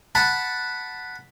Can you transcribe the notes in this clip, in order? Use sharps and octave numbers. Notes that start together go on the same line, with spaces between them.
F#5 A5 B5